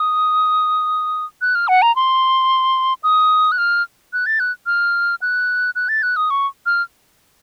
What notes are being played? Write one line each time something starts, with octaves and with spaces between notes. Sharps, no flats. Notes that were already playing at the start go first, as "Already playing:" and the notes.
Already playing: D#6
F#6
F6
F#5
A#5
C6
D#6
F#6
F6
F#6
A6
F#6
F6
F#6
F#6
A6
F#6
D#6
C#6
F6